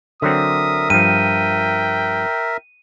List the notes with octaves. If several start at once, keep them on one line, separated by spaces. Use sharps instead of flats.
D3 F#3 C4 A#4 E5 D#6
G2 F3 G5 D#7